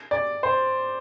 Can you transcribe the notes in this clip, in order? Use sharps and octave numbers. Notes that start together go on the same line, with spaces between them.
D5
C5